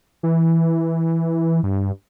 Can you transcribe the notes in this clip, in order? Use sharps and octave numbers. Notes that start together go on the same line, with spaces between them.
E3
G2